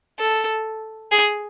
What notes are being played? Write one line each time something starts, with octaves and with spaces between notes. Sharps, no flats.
A4
G#4